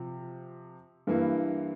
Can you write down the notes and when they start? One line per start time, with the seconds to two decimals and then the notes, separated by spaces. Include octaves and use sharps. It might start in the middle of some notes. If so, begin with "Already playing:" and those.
Already playing: C3 F3
1.07 G2 E3 A#3 E4